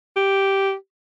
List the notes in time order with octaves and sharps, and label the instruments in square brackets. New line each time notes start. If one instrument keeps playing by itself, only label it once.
[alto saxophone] G4